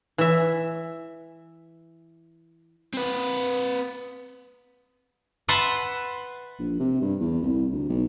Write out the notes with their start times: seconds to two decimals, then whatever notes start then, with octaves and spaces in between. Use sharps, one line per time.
0.18 E3 E5
2.93 C4 B4
5.48 B4 E5 F#5 A5 B5 C6
6.59 A#1
6.79 C3
7.02 G2
7.20 E2
7.42 C2
7.72 D2
7.89 B1